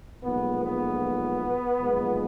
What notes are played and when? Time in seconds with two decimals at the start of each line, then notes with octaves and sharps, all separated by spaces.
0.24 B1 A#2 F3 G#3 B3
0.63 B3
1.80 B1 A#2 F3 G#3